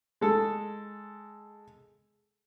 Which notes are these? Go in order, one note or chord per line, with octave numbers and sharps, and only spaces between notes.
G#3 A4